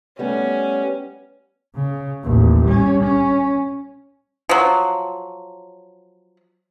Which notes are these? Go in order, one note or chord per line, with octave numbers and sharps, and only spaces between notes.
G3 A3 B3 C#4
C#3
A1 D#2
G3 C#4
C#4
F3 F#3